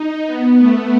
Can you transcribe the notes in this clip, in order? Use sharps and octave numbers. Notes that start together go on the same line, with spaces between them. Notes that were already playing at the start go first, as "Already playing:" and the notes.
Already playing: D#4
B3
A3